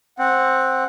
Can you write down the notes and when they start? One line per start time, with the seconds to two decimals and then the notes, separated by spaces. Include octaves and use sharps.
0.19 C4 F#5